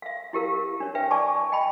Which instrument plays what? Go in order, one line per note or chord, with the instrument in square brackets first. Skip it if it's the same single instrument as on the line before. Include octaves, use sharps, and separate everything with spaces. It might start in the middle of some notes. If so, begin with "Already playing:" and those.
[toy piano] E5 F5
E4 G4 A#4 F5
D4 C#5
B4 E5 G5
D5 G#5 A5 C#6 D6
D#5 G5 A5 B5